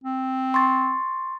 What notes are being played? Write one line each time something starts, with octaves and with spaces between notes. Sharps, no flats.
C4
C6 C#6 A6